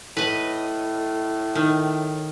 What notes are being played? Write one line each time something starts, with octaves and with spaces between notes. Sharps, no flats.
A2 B4 D#5
D#3